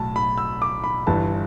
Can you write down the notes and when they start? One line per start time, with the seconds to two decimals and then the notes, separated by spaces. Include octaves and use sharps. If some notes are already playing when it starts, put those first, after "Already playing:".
Already playing: B1 A2 A5
0.16 B5
0.38 E6
0.62 D6
0.84 B5
1.07 G1 G2 E3 A5